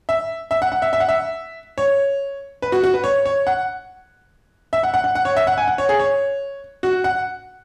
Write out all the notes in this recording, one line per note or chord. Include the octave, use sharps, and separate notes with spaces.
E5
E5
F#5
F#5
E5
E5
F#5
E5
C#5
B4
F#4
F#4
B4
C#5
C#5
F#5
E5
F#5
F#5
F#5
F#5
C#5
E5
F#5
G#5
F#5
C#5
G#4
C#5
F#4
F#5